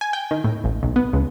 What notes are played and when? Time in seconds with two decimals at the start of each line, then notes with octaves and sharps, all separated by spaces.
0.01 G#5
0.13 G5
0.31 D#3
0.44 A2
0.64 A1
0.83 B1
0.96 B3
1.13 C#2